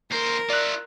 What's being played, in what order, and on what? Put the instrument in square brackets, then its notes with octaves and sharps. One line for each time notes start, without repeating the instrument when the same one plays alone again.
[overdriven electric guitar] D#2 C5 [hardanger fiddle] A#4
[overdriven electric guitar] F4 E5 [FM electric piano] D5 F#6